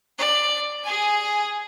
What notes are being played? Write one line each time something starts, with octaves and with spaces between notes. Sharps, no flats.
D5
G#4 G#5